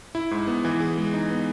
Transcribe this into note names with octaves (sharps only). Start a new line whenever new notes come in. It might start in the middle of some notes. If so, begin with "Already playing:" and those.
E4
G#2
B3
E3
G#4
G#3
D#4
B3